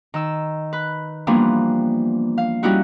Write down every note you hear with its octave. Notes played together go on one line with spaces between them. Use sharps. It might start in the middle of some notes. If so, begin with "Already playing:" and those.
D#3 E6
B4
E3 F3 G3 A#3 B3 D4
F5
G3 C#4 D#4 E4 F#4